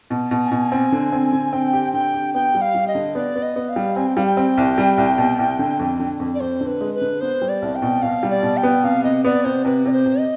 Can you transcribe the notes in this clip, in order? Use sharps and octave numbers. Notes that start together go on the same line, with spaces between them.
B2
B2
G#5
B2
C4
D3
C4
D3
C4 G5
G4
D3 G5
G4
B3 G5
G3
F5
G3
D#5
D3
B3 D5
B3
D#5
B3
F5
G3
C4 G#5
G5
G3 F5
G5
C4
C2
G3
C2
B2
C2
D3
F2
D3
F2
D5
F2 C5
D3
B4
G#3
B4
D3
B3 C5
G3
D5
C2
G5
B2
B2 F5
G3
D5
B2
G5
B3
C3 F5
C3 D#5
B3 D5
C3 C5
C3 B4
C3 D5
C5
C3
D#5